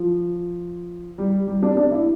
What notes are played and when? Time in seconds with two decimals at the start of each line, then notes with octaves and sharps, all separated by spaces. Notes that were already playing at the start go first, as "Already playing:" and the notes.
Already playing: F3
1.18 G3
1.47 G3
1.63 D4
1.77 D4
1.91 E4